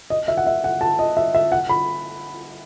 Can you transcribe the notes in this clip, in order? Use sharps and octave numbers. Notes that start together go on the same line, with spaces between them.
D#5
E5
F#5
E5
F#5
A5
D#5
E5
E5
F#5
B5